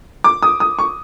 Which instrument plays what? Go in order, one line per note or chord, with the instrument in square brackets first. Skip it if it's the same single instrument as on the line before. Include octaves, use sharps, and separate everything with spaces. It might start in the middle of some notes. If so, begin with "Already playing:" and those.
[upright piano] D6
D#6
D#6
C#6